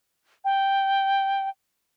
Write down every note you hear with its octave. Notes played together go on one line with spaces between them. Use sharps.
G5